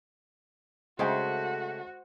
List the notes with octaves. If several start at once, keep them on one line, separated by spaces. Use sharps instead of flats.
C#3 G#3 A3 F#4 C5 D#5 G5